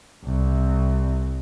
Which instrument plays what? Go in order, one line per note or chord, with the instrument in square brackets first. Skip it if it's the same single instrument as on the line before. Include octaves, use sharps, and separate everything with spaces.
[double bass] C2